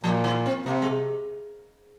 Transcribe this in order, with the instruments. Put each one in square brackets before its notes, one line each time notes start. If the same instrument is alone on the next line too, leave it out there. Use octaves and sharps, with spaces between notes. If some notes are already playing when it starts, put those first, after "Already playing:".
[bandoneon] A#2 [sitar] F3
[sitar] D#3
C4
[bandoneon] C3 [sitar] A#3
[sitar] G#3